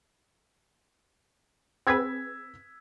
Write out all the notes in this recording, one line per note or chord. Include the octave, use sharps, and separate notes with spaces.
C4 G#4 B4 E6 G#6 B6